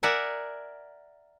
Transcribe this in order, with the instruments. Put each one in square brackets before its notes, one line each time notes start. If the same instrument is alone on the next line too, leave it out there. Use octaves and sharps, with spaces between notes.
[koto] A#4 D5 E5 F#5 G#5